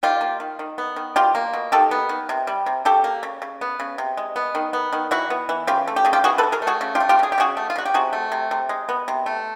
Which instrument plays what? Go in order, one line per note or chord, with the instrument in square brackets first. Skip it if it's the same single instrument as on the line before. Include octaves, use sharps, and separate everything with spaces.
[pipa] D#3 F4 G4
A#3
D#3
D#3
B3
D#3
B2 F4 G4
A#3
B2
D#3 G4 A4
B3
D#3
C3
G3
C3
C#3 G4 A4
A#3
C#3
C#3
B3
C#3
C3
G#3
B3
D#3
B3
D#3
E3 E4 F#4
B3
E3
C#3 F4 G4
A3
G4
C#3 G#4
F4 G4
E3 F#4 G#4
A4 B4
E3
G#4 A#4
A3
F#4 G#4
C#3
F4 G4
A3
F4 G4
C#3 G#4
G4
C#3 F#4 G#4
A3
F4
C#3 F#4
G4
C3 F#4 G#4
A3
C3
C3
G#3
B3
C3
A3